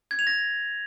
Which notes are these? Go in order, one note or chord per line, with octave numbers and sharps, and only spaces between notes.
G#6
F7
A#6